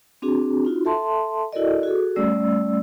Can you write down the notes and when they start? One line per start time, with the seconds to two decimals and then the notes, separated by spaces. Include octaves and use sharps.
0.22 C4 D4 F#4 G#4
0.65 D#4 F4 F#4
0.85 A4 E5 A5 C6
1.53 E4 F#4 A4 A#4 D5 D#5
1.83 F#4 G#4 A4
2.16 G3 A3 C#4 D5 E6